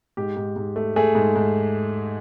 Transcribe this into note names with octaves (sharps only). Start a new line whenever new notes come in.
G#2 G4
G#2
G#2
A3
A3 G#4
G#2
G#2